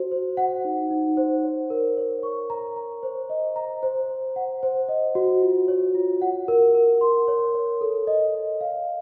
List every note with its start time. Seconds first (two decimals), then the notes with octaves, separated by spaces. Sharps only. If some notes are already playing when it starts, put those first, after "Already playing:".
Already playing: F#4 C5
0.11 C5
0.37 F#5
0.65 D#4
0.90 D#4
1.17 C5
1.44 C#5
1.70 A#4
1.97 C#5
2.23 C#6
2.50 A#5
2.76 A#5
3.03 C5
3.30 D#5
3.56 A#5
3.83 C5
4.09 C5
4.36 F#5
4.63 C5
4.89 D#5
5.15 F#4
5.42 F4
5.68 C#5
5.95 F4
6.22 F#5
6.48 A#4
6.75 A#4
7.01 C6
7.28 C#5
7.55 C#5
7.81 A4
8.07 D#5
8.34 D#5
8.61 F5